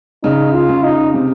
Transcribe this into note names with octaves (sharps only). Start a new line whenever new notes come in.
C#3 D#4
F4
C#3
D#4
C3